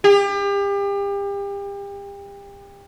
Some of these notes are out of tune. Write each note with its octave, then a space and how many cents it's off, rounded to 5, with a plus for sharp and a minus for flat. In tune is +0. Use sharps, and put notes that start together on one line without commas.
G4 +35